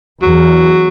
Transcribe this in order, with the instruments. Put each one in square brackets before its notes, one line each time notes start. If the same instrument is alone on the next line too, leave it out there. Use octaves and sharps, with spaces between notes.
[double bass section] E2 [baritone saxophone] F#3